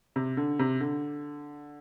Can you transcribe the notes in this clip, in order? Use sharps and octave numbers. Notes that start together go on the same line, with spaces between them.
C3
D3
C3
D3